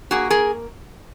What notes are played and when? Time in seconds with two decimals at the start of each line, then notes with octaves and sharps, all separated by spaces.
0.11 A#3 F#4 G#4
0.30 G#4 A#4